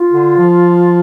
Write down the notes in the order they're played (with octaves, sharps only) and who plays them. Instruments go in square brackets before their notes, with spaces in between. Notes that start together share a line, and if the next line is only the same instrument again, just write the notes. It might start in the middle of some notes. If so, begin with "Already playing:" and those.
Already playing: [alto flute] F4
[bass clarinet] D3
F3